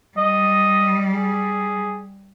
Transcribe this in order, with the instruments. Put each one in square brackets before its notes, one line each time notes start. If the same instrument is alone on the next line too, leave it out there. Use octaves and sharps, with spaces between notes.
[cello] G3 [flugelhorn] D#5
[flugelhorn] G#4